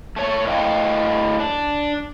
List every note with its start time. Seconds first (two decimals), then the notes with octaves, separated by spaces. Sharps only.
0.16 A3 C#5
0.47 A2 D#5 F5 G5
1.40 D4